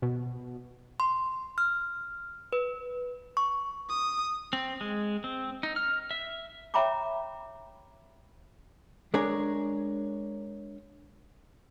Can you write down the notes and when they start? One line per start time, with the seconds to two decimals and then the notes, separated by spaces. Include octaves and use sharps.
0.02 B2
1.00 C6
1.58 F6
2.53 B4
3.37 C#6
3.89 D#6
4.53 C4
4.81 G#3
5.24 C4
5.63 D#4
5.76 F6
6.11 E5
6.74 C#5 E5 G5 A#5 B5 D6
9.14 G#3 D4 G#4 A#4 C#5